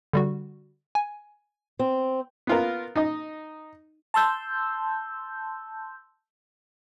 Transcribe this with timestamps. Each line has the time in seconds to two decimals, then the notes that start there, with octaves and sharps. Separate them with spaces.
0.13 D3 G3 F#4
0.95 G#5
1.79 C4
2.47 B3 F4 A#4
2.96 D#4 D#5
4.14 A5 C6 E6 G6